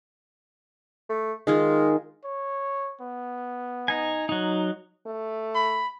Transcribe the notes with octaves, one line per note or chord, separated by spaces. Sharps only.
A3
D#3 G#3 F4 G#4
C#5
B3
D#4 G#5
F#3 D#4
A3
B5